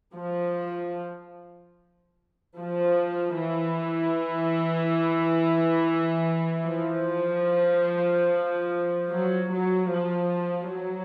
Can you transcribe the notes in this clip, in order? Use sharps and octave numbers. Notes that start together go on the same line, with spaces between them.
F3
F3
E3
F3
F#3
F#3
F3
F#3